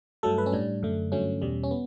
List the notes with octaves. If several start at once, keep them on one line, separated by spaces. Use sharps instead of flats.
G2 F#3 A3 A4
B4
C#4
A2 G3 D4
F#2 D3 A3
G2 D3 F#3 A3 C#4
E2 B2 G3
C#4
B3